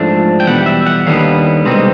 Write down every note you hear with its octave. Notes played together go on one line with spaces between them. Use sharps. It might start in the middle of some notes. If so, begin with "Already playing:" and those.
Already playing: G#2 F3 A3 D4
G5
E2 B2 G3 F#5
E5
F#5
D#2 D3 G3 B3 D#4 F5
C2 B2 G#3 C4 D#4